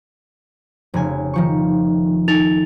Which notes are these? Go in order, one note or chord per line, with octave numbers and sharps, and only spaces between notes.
F1 C#3 G#5
D#3 F3 C#6
D#4 A4 A6 F7